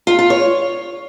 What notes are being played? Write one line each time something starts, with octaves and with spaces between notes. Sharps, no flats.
F4
F4
C#5